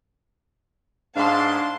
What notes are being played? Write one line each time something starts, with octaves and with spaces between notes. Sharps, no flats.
G#2 D4 F5 A5 C6